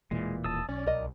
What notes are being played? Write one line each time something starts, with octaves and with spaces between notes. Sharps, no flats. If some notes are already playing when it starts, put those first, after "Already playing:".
E1 A#2 E3 G#3
D#1 A5 D#6 E6
B1 C#4 D5
C2 A#4 D#5